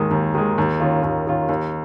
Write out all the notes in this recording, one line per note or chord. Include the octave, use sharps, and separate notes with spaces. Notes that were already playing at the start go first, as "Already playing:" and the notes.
Already playing: D#2 D#3 G#3
D#2
D#3 G#3
D#2
D#3 C#4 F4
D#2
D#3 C#4 F4
D#2